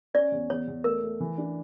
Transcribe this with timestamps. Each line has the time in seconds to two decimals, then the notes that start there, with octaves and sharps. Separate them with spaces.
0.14 C#4 D5
0.32 E2
0.50 E2 C#5
0.68 E2
0.84 A3 A#4
1.02 A3
1.20 E3
1.38 D4